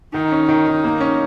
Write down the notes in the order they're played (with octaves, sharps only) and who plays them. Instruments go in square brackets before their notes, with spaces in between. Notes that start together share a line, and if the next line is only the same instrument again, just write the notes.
[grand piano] D#3 [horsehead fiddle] D#4
[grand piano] C#4
D#3
D#3
A#3
C#4